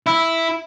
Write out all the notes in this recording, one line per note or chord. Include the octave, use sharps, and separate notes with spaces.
E4